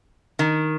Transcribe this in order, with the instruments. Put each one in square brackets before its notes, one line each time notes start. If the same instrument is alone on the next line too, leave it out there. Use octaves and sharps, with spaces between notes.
[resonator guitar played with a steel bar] D#3